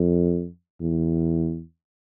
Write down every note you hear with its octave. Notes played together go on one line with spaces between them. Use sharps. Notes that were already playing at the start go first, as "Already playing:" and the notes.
Already playing: F2
E2